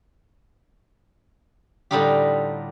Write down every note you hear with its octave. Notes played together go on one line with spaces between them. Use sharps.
A2 D3 G3 D#4 F4 G4